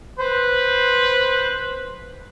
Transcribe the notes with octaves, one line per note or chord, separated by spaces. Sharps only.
B4 C5